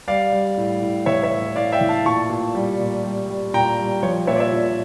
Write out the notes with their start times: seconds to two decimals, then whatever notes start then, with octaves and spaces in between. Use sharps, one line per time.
0.08 G3 D5 F5
0.33 G3
0.57 A2
0.82 A2
1.06 E3 C#5 E5
1.23 C#5 E5
1.32 A2
1.56 A2 D5 F5
1.72 E5 G5
1.81 E3
1.89 F5 A5
2.05 A#2 A5 C#6
2.30 A#2
2.55 G3
2.79 A#2
3.04 G3
3.29 G3
3.54 A#2 G5 A#5
3.79 G3
4.03 F3 C#5
4.27 A#2 C#5 E5
4.36 D5
4.40 C#5 E5
4.53 A#2